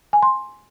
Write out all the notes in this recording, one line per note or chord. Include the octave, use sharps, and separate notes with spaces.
G#5
C6